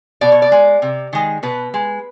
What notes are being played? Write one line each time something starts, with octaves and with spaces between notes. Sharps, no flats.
B2 D5
C#5
D5
G#3
C3
D#3 G#3
B2 B4
G#3